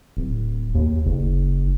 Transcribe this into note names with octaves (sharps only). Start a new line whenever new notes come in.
D1
D#2
F#1